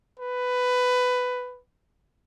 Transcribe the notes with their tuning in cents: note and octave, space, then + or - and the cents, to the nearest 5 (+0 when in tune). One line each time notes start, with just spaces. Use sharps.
B4 +10